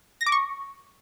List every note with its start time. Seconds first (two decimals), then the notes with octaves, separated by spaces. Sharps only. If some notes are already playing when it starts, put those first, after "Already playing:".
0.21 A#6
0.26 D6
0.32 C#6